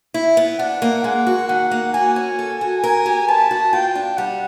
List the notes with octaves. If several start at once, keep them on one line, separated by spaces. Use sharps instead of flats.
E4
B3
D4 F#5
A#3
G#3 F#5
F#4
D#3 F#5
A#3
F#4 G#5
C#4
A4
F#4
A#4
G4
B4 A5
F#4
F4 G5
D4
G3 F#5